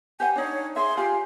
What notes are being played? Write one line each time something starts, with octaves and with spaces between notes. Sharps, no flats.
G4 C5 F#5 G#5
D4 D#4 C#5
G#4 E5 C6
F4 G4 F5 G#5